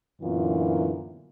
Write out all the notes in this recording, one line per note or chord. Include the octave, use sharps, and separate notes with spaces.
F#2 A#2 D3 E3 B3 F4